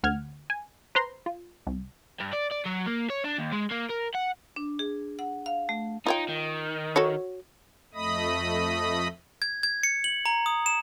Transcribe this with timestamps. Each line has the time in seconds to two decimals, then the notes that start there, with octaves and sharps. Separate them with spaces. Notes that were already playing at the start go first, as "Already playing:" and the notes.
0.03 D2 F#5 F6 G#6
0.50 G#5
0.95 B4 C5 A#5 C6
1.26 F4
1.67 C2
2.20 G2
2.33 D5
2.52 D5
2.66 F#3
2.87 A#3
3.10 C#5
3.24 D4
3.39 D#2
3.52 G#3
3.71 A#3
3.90 A#4
4.15 F#5
4.56 D4
4.79 G#4
5.19 F#5
5.46 F5
5.69 A3
6.06 D#4 F4 C#5 G5
6.29 D#3
6.96 F#4 A4 C#5
7.94 F2 A3 D#5 B5 D#6
9.42 G#6
9.63 G#6
9.83 C#7
10.04 F#7
10.26 A#5
10.46 D#6
10.66 E7